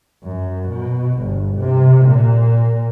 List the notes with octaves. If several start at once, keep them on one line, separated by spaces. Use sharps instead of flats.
F#2
B2
G1
C3
A#2